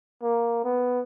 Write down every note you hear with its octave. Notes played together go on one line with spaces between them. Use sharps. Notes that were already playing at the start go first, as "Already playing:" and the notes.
A#3
B3